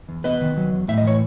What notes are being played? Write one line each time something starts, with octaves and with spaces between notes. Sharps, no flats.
E2
B3 B4 D#5
D#3
F#3
E2
A2 E5
D#5
E3 C#5